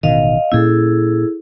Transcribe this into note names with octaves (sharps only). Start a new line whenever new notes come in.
A1 B2 D#3 D#5 F5
A#2 A#3 C#4 E4 G#4 A4